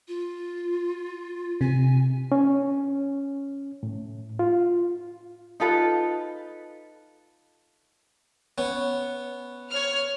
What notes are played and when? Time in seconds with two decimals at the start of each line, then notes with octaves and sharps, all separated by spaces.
0.08 F4
1.61 C3 G#5
2.32 C#4
3.83 A2
4.39 F4
5.60 D#4 F4 A4 B4
8.58 B3 C#4
9.70 C#5 F6